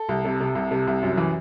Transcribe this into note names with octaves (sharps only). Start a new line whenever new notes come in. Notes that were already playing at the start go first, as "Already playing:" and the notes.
Already playing: A4
C2
C3
C3
C2
C3
C2
F#2
E3